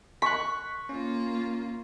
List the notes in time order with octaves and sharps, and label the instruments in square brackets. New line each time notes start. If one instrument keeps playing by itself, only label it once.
[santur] C#6 [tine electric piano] F#6 B6
[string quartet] A#3 F4 [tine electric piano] C#4